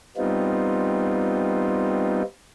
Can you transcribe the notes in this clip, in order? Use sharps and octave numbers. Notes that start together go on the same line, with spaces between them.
G3 B3 C4 D#4 F4